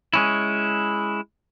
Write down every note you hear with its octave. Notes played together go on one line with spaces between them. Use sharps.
G#3 C#4 E4